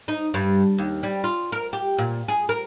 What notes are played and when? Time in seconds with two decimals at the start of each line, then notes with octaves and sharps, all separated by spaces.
0.08 D#4
0.34 G2
0.78 D#2
1.03 G3
1.24 F4
1.52 A#4
1.73 G4
1.98 A#2
2.28 G#4
2.49 A#4